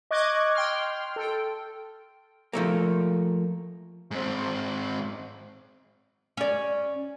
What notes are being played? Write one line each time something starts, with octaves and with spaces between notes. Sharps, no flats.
D#5 C#6 D6 F#6 G#6
G5 C6 F6
A4 G5
F3 A3 A#3
G#2 C4
C#4 D5